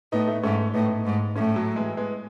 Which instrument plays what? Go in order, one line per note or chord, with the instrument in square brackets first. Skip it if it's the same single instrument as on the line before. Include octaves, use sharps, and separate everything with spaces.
[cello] A2 [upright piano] B3 D#4
[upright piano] A3
B3
[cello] G#2 [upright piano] A3 C#4
[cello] A2 [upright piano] B3 D#4
[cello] G#2
[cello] A2 [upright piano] A3 C#4
[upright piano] F#3 A3
E3 G#3
G#3 B3